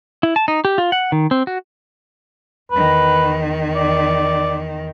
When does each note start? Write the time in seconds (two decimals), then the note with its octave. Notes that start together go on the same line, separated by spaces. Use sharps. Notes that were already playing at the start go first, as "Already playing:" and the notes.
0.23 E4
0.36 A5
0.48 D#4
0.65 G4
0.78 F4
0.92 F#5
1.12 D#3
1.31 C4
1.47 F#4
2.71 E2 D#3 B4
3.76 D5